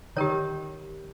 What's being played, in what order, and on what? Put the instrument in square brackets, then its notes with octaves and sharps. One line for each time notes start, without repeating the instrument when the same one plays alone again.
[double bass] D#3 [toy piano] G4 A#4 C#5